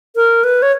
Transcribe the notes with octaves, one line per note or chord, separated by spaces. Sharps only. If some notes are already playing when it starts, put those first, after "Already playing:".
A#4
B4
C#5